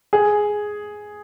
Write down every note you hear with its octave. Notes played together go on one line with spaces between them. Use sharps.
G#4